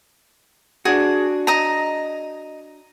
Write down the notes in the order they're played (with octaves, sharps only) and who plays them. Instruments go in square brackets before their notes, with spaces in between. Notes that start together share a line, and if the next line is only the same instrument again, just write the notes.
[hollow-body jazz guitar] D4 F#4 [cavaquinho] G#4
[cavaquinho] D#5 A#5